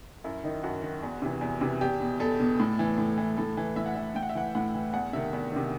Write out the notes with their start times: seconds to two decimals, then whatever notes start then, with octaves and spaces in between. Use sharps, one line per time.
0.24 F#2 E4
0.44 D#3 D#4
0.63 F#2 F#4
0.82 D#3
1.03 E2
1.22 C3 E3
1.41 E2
1.61 C3 E3
1.81 E2 G4
2.00 B2
2.20 E2 A4
2.40 B2
2.60 A2
2.79 E3
2.98 A2
3.18 E3
3.37 A2 A4
3.57 E3
3.76 A2 E5
3.86 F#5
3.95 E3 E5
4.15 A2 G5
4.23 F#5
4.29 E5
4.35 E3 F#5
4.55 A2 F#5
4.74 E3
4.93 E2 F#5
5.13 C3 D#3 E5
5.33 E2
5.52 C3 D#3